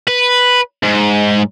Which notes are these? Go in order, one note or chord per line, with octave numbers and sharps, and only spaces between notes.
B4
G#2